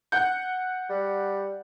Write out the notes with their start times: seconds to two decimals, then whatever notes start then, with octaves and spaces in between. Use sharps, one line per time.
0.12 F#5 G6
0.90 G3